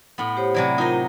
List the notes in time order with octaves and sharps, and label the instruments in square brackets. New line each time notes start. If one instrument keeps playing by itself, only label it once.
[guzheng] A2 B3
[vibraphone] G4 C5 C#5
[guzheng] C3 F#3 E4 [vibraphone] D5
[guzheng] D#4 D#5 [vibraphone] F4 A#4 C5